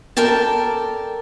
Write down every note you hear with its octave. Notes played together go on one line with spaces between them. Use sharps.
A4 A#4 D5 G5 A5